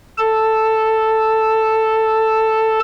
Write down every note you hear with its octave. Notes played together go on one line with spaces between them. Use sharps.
A4 A5